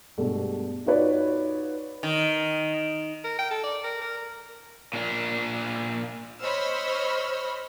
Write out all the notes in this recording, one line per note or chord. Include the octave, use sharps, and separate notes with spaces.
G2 B2 G#3 A3 G4
D#4 F4 F#4 B4 C#5 D5
D#3
A#4
G5
A4
D5
A#4
A#4
A#2 D4
C5 C#5 D#5 B5 E6 F6